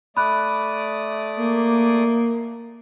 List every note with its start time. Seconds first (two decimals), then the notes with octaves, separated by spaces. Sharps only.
0.17 A3 D5 B5 D#6 F#6
1.38 A#3